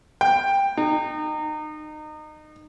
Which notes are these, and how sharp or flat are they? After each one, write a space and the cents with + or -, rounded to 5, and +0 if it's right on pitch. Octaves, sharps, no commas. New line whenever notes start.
G5 +10
D#4 -30